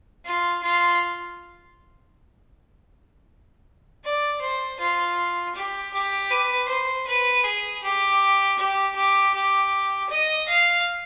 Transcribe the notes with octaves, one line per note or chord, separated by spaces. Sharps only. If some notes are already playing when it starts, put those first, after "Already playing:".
F4
F4
D5
C5
F4
G4
G4
B4
C5
B4
G#4
G4
G4
G4
G4
D#5
F5